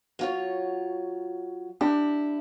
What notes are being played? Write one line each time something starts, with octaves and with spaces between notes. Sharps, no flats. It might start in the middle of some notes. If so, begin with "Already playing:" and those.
F#3 F4 C#5
D4 E4 G4